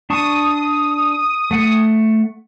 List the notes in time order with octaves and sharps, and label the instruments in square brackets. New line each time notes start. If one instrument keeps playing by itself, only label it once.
[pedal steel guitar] D4 A5 C#6 [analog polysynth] D#6
[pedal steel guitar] A3 F#5